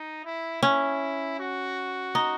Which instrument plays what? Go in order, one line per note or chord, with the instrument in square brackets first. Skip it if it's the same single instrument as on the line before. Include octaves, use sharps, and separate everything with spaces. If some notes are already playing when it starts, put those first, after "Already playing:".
Already playing: [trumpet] D#4
E4
[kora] C#4 [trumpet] E4
[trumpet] F#4
[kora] D#4